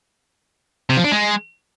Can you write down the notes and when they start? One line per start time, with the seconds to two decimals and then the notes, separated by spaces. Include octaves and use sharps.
0.90 C3
0.97 F3
1.04 D4
1.12 G#3